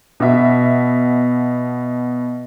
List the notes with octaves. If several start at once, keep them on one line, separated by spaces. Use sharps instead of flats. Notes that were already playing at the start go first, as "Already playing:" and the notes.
B2 E5